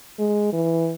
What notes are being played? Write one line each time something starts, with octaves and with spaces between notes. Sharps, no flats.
G#3
E3